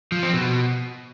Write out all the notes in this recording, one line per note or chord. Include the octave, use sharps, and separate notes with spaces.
F3
C4
B2